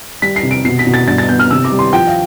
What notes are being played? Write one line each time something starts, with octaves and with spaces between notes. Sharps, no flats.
G3 B6
C7
C3
D7
B2 C7
B6
B2
A6
G2 A6
A6
B3 G6
F6
C3 E6
D6
G3
C6
F3 G5
F5